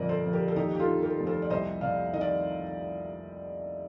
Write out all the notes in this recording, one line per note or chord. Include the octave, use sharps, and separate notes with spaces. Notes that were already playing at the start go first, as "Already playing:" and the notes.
Already playing: G1 F2 A#2 A#4 D5 D#5
A4 C5
F2
G4 A#4
A4
D#2 D#4 G4
G4
F4 A4
D#3
G4 A#4
F1
A4 C5
D5
C2 C5 D#5
C3 D5 F5
D#3 D#5
D5